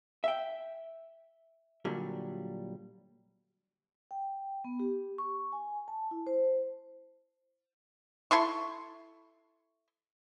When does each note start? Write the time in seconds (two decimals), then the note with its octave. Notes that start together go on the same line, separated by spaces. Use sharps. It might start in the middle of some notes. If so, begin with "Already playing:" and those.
0.24 E5 G5
1.85 A#2 D3 F#3 G3
4.11 G5
4.64 B3
4.80 G4
5.18 C#6
5.52 G#5
5.88 A5
6.11 E4
6.27 C5
8.31 E4 A4 C6 C#6